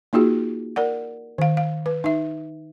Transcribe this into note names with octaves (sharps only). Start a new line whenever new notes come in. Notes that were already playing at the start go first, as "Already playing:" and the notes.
A#3 D#4 F4 F#4 G#4
A#4 D5 F#5
D#3 F5
F5
B4
D#4 E5